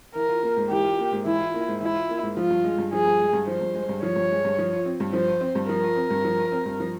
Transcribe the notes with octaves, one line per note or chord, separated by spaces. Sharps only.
E3 A#4
F4
A#3
G#2
E3 G4
F4
A#3
G#2
E3 E4
F4
A#3
G#2
E3 E4
F4
A#3
G#2
F3 F4
G2
G#3
G2
F3 G#4
G2
G#3
G2
F3 C5
G2
G#3
G2
F3 C#5
G2
G#3
G2
F3
F4
C4
G2
F3 C5
F4
C4
G2
F3 A#4
F4
C4
G2
F3
F4
C4
G2
F3